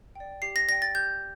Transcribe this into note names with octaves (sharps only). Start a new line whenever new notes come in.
D5 G5
G4 C7
A#6
D5 G5 A#6
A6
G4 G6